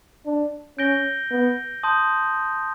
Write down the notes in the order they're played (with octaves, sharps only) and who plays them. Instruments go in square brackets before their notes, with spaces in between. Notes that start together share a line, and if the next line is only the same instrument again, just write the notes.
[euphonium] D4
[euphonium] C#4 [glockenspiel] G6 A#6 D7 G7
[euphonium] B3
[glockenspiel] A5 C6 D#6 G6